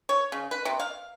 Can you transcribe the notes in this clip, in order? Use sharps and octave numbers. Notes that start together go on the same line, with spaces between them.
C#5
C#3
B4
C3
F5